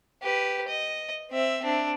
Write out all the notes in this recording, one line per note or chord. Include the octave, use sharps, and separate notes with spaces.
G4 B4
D#5
C4 E5
C4 D4